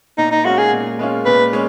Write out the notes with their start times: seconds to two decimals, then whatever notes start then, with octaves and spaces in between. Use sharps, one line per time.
0.18 A#2 D#4
0.32 D#4
0.45 G#3 C#4 F4 F#4
0.58 G#4
0.72 A#2
0.99 G#3 C#4 F4
1.26 A#2 B4
1.53 G#3 C#4